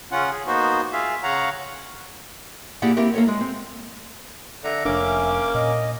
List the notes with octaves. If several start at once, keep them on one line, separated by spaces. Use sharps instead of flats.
C#3 C#4 F4 F#5
G#4
A#3 B3 D#4 F#4 C5
F4 G#4 E5 F5
C#3 C#5 F5 F#5 A#5
A#3 E4 G4 G#4 D5 F#5
A#3 C4 E4 G4 A#4
A#3 A4 C#5
G#3
C4
D3 E5 A#5
F1 A#3 C#4 D4 D6
A#2 D#5